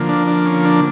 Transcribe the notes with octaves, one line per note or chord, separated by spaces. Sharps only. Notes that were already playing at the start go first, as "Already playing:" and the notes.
Already playing: D3 F3 A#3
D4
D4
C#4
D4